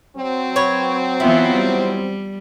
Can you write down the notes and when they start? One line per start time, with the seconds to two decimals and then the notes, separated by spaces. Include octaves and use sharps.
0.16 F#3 C4
0.56 B4 C#5
1.20 E3 B3 E4 F4
1.55 G3